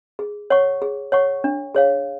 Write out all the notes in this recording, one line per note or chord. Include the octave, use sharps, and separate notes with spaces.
G#4
C#5 F#5 C#6
G#4
C#5 F#5 C#6
D4
G#4 C#5 F5